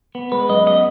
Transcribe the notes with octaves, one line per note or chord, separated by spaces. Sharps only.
B3
G#3 B4
F#2 D#5
B3 D#5